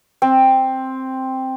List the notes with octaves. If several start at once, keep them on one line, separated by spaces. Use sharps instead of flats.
C4